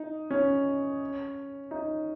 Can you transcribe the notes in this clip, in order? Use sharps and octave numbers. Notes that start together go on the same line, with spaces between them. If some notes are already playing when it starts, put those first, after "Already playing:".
Already playing: D#4
C#4
D#4